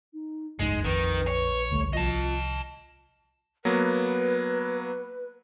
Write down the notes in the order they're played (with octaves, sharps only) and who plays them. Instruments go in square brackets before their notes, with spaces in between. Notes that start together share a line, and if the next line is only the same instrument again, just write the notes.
[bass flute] D#4
[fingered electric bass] F#1 C#2 G#2 [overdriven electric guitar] G#3 [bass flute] D#4
[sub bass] A#1 [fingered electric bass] F2 [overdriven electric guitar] D#3 [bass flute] B4
[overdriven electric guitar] C#5
[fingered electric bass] D2 D3 G3 [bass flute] A3
[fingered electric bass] C2 F3 [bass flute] F4 [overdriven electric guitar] D#5 A5
[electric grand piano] F#3 A#3 B3 [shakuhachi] B4